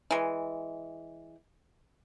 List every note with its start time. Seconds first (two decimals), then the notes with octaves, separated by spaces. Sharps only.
0.11 E3 G#3